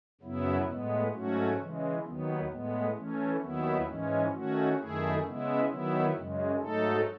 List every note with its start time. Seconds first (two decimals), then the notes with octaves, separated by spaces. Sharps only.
0.21 F#2 C#3 F#3 B3 E4
0.67 A2 G#3 B3
1.13 G#2 F#3 A3 C#4 F#4
1.58 C#3 E3 G#3
2.04 D#2 D#3 F#3 B3
2.49 A2 G#3 B3
2.96 E3 A3 C#4
3.41 D#2 D#3 F#3 B3 E4
3.86 G#2 E3 G#3 C#4
4.32 D#3 A3 C#4 F#4
4.78 F#2 D#3 A3 E4 G#4
5.24 C#3 G#3 B3 E4
5.69 D#3 F#3 B3 E4
6.15 F#2 C#3 G#3
6.60 G#2 F#3 A3 D#4 A4